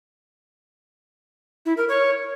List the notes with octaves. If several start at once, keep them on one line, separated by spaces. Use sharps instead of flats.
E4
A#4
C#5